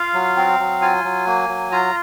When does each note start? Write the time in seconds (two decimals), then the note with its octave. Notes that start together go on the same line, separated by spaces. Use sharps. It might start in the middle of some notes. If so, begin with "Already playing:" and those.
Already playing: F4 F5
0.14 F#3
0.37 C4
0.59 F#3
0.82 F4 G#5
1.04 F#3
1.27 A#3
1.49 F#3
1.72 F4 A#5